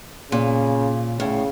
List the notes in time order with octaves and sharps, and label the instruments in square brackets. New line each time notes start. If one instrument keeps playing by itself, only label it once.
[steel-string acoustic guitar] A#2 [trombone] C#3
[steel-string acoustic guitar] A2 [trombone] C#3